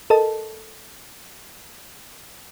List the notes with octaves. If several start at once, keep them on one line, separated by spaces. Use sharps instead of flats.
A4 A#4 D#5 A5